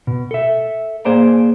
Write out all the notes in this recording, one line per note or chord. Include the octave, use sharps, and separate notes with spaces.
B2
A4 E5
A#3 G#4 C5 D5 A#5